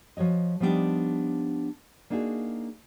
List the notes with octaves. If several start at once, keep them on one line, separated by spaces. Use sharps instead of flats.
F3 F#4 C#5 D#5
F3 G3 B3 D4 D#4 G4
A#3 D4 D#4 F#4 G#4